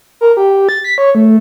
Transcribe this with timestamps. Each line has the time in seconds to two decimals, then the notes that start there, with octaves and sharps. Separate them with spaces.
0.21 A#4
0.37 G4
0.69 A6
0.84 B6
0.98 C#5
1.15 A3